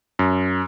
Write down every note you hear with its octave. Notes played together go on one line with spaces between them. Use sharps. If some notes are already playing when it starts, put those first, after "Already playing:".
F#2